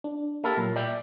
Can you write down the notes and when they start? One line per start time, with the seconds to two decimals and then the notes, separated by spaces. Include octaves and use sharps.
0.04 D4
0.44 A#3 E4 G4 A4 A#4
0.57 A#2 F#3
0.76 D5 E5 G5